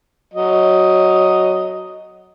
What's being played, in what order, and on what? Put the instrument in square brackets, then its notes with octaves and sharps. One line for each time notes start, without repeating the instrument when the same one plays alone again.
[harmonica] F#3 D#5